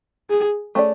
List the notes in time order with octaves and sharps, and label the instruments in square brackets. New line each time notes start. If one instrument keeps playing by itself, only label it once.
[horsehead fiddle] G#4
[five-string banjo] A3 C#4 G#4 D5